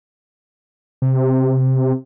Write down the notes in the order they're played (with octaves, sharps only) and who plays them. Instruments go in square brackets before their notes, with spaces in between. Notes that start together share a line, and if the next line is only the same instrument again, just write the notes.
[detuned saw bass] C3